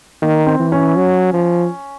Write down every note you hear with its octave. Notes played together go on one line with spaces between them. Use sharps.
D#3 A#3
C4
E3
C#4
F#3
F3